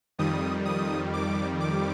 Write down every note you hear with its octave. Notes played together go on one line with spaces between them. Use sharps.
F2 D#3 G3 D#6
D#6
D6
D6